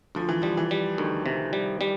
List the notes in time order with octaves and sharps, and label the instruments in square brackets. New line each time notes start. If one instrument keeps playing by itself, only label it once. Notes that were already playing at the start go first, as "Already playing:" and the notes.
[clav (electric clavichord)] D2 [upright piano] F3
[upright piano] E3
[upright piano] F3 [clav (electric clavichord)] G3
[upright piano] E3
[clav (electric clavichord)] G3
[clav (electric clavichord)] D2 [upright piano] D#3
[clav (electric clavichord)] C3
G3
G3